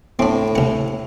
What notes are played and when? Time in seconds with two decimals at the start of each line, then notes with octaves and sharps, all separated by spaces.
0.19 A2 C4 D4
0.55 C2 F#5